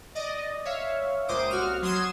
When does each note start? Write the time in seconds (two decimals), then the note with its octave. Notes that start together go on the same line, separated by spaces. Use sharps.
0.15 D5 D#5
0.65 C#5 E5 F5
1.28 C#2 A#2 C5 D6 D#6
1.50 C2 F#4 F6
1.82 F#3 C6 D#6 G#6 E7